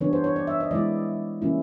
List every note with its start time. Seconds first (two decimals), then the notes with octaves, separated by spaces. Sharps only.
0.01 E3 G3 B3 D4 C#5
0.13 C5
0.24 C#5
0.36 D5
0.47 E5
0.60 D#5
0.71 E3 G#3 B3 E4 D5
1.42 E3 G3 A#3 C#4 E4